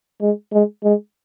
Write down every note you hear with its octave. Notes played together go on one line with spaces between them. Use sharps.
G#3
G#3
G#3